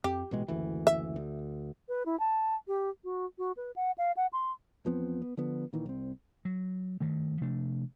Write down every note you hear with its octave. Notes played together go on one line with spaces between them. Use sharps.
F2 G4
A1 B2 G#3
F#1 D2 E3
E5
D2
B4
E4
A5
G4
F#4
F#4
B4
F#5
F5
F#5
C6
E2 F3 B3 C4
B3
D3 F3 B3
A#2 D#3 E3
C2 C4
F#3
G2 D#3 A3
C3 F3 A3 D4